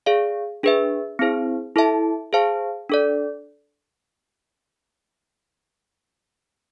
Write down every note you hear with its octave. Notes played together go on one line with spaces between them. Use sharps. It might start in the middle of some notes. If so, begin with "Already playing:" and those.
G#4 D5 F5
D4 G#4 B4 E5
C4 E4 G#4 C5
E4 A4 E5 A5
G#4 C5 F5 A5
D4 A4 D5